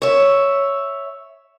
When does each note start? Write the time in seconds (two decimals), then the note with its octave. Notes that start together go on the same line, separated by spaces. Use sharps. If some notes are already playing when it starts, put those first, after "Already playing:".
0.02 C#5 E5